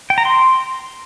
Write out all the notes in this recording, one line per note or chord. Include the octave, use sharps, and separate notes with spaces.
G5
A#5
C6